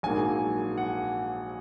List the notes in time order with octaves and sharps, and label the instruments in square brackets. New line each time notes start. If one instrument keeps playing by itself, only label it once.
[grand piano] A#1 G#2 F#3 A#3 G#5
F#5